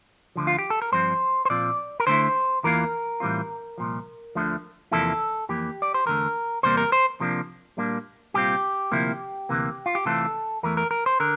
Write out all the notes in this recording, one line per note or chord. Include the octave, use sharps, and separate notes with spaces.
D2 D3 F3
F4
G4
A4
A#4
G2 F3 C4 C5
C5
A#2 F3 C4 F4 D5
A#4
D3 A3 E4 C5
E2 E3 A#3 F4 A#4
A2 E3 G3 C4 F4
C2 A#2 F3
D2 D3 F3 A3
E2 C3 F3 A#3 E4 A4
F2 E3 A#3 G4
D5
C5
E2 D3 A3 A#4
E2 C3 G3 A#3 C5
A#4
C5
C3 F3 A#3 D4
A#2 G3 A#3 D4
C2 A#2 G3 C4 F4 G4
D2 C3 F3 A#3 E4
D2 C3 E3 A#3
F4
G4
C3 E3 A3 C4 F4 A4
E2 E3 A3 A#4
A#4
A#4
C5
D3 A#4